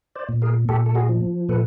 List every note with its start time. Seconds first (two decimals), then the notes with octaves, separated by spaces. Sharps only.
0.15 C5 D5
0.29 A#2
0.42 G#4 A#4
0.69 A#2 G4 A4
0.86 A4
0.95 F#4 G#4
1.09 F3
1.49 A#2 A4 B4